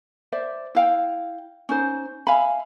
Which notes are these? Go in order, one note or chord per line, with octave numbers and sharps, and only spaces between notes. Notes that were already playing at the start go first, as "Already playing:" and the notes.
C5 D5 E5
E4 F5 G5
C#4 D#4 C5
E5 F5 G#5 B5